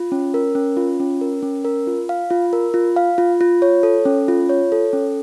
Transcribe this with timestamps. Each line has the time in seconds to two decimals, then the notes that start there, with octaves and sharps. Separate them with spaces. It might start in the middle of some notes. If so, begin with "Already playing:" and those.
Already playing: F4
0.12 C#4
0.34 A#4
0.55 C#4
0.77 F4
1.00 C#4
1.21 A#4
1.43 C#4
1.65 A#4
1.87 F4
2.09 F5
2.30 F4
2.53 A#4
2.74 F4
2.96 F5
3.18 F4
3.41 F4
3.62 C#5
3.83 A4
4.05 C#4
4.28 F4
4.49 C#5
4.72 A4
4.93 C#4